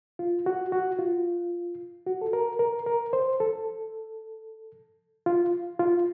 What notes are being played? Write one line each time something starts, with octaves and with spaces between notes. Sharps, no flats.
F4
F#4
F#4
F4
F#4
A4
A#4
A#4
A#4
C5
A4
F4
F4